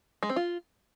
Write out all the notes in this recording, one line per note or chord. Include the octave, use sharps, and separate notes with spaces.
G#3
C4
F4